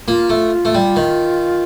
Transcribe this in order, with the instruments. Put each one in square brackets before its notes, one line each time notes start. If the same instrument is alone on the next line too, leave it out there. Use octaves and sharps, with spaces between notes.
[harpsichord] A#3 [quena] F4
[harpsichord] A3
A3
G3
D#3